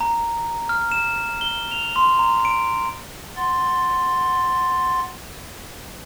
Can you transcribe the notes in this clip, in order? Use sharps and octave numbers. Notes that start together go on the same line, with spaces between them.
A#5
F6
E7
G7
F7
C6
A#5
D7
F#5 C6 A6